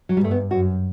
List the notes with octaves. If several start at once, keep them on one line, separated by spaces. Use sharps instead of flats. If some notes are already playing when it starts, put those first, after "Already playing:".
F#3
G3
G2 A3
B3
F#2 F#4